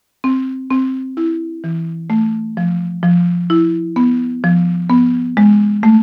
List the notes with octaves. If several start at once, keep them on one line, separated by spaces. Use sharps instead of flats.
C4
C4
E4
E3
A3
F3
F3
E4
B3
F3
B3
G#3
A3